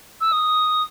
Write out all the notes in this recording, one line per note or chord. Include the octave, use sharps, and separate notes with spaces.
E6
D#6